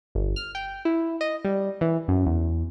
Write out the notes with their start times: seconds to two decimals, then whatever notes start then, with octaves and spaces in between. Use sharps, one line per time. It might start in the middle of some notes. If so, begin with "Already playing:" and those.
0.15 G1
0.36 F6
0.55 G5
0.85 E4
1.21 D#5
1.45 G3
1.81 E3
2.08 F#2
2.26 E2